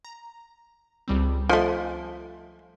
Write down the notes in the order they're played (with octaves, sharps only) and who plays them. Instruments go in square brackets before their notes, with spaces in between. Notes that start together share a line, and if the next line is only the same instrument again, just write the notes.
[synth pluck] A#5
C#2 G3 C4
[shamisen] F3 A3 [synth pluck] D#5 G#5 C6